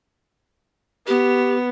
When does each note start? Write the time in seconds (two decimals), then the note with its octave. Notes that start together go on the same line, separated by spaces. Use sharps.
1.07 B3 G4